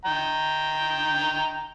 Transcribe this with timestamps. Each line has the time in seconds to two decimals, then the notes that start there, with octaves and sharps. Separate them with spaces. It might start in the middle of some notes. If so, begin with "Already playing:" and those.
0.05 G5 A#5